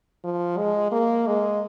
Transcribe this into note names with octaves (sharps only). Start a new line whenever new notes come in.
F3
G#3
A#3
G#3